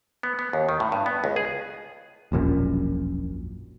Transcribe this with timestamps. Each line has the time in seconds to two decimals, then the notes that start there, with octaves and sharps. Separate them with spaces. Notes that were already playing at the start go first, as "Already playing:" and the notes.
0.23 B3
0.39 B3
0.53 D#2
0.69 D#3
0.80 A2
0.92 G2
1.06 B3
1.24 C#2
1.36 G#4
2.32 E1 A#1 F#2 A#2